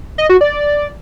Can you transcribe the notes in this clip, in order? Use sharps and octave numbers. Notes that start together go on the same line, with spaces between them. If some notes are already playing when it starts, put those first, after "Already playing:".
D#5
F#4
D5